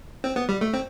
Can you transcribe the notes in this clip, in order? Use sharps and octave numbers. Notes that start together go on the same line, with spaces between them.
C4
B3
G3
A3
C4